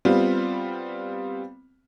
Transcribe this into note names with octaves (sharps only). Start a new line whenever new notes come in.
G3 B3 C4 F4